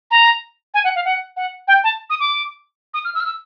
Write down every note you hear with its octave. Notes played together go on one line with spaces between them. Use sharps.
A#5
G#5
F#5
F5
F#5
F#5
G5
A5
D#6
D6
D#6
F6
E6
F6
E6